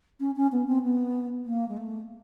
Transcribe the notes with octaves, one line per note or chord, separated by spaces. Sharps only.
C#4
C#4
B3
C4
B3
A#3
G#3
A3